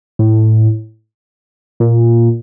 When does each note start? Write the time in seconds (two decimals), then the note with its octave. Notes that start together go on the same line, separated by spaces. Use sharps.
0.19 A2
1.80 A#2